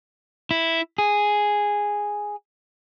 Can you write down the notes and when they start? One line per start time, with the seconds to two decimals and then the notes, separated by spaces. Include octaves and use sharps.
0.51 E4
0.98 G#4